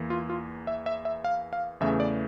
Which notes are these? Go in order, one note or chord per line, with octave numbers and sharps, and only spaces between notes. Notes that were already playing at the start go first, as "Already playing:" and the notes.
Already playing: E2 E3 A#3
F4
F4
E5
E5
E5
F5
F5
E2 C#3 E3 A3 E5
D5